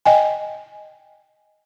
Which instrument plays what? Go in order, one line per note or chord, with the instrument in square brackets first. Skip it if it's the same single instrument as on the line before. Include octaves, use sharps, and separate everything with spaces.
[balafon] D#5 G5 G#5